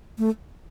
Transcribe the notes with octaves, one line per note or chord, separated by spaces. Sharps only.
A3